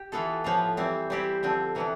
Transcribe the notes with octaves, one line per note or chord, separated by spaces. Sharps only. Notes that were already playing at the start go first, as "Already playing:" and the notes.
Already playing: G4
E3 B3 F4 A4
A2 F3 B3 F4
E3 G3 C4
G3 C4 E4 G4
D3 F3 C4
C3 E3 B3 D4